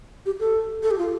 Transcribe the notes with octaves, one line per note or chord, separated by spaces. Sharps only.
G4
A4
A4
G4
F4